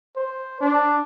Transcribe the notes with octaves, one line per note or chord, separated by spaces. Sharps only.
C5
D4